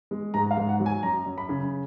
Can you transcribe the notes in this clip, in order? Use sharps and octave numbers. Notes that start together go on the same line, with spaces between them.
G#3
G#2 A#5
F5
G#2
F#5
F#3
G#5
F#2 A#5
F#2
B5
C#3